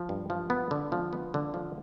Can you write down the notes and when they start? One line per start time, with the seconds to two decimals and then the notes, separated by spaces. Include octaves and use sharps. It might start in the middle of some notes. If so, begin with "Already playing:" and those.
Already playing: F3
0.09 G2
0.30 F3
0.50 B3
0.71 D3
0.92 F3
1.13 B3
1.34 D3
1.54 F3